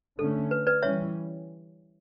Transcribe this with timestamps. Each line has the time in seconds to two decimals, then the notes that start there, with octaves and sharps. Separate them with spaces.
0.19 D3 A3 C#4 A4
0.51 B4
0.67 B4 D5
0.82 E3 G3 C#4 C#5 E5